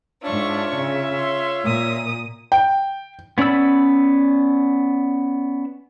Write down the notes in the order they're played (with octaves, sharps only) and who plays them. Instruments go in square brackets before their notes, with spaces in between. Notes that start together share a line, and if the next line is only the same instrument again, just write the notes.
[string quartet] G#2 D4 C#6 [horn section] F4 C#5 E5
[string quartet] C#3
C6
A#2 D#6
[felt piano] G5
[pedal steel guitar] B3 C#4 D5 B5 E6